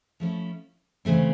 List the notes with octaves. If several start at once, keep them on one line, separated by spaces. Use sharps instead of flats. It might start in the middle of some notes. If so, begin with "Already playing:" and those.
F3 A3 C#4 E4
D2 C#3 E3 A3 C4